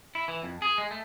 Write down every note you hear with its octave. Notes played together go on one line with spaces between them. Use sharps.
E4
E3
F2
G#4
G#3
A3